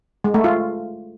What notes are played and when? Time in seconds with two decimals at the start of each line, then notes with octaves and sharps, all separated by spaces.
0.24 G#3
0.34 A3
0.44 F4